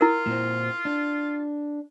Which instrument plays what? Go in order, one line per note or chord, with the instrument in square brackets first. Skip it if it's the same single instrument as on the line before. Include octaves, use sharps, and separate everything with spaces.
[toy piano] E4 A#4 [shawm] F4
[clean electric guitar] A#2 C4
D4